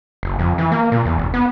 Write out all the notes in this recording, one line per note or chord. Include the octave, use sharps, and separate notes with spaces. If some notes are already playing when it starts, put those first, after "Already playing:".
F#1
F2
E3
A#3
A#2
E2
F1
B3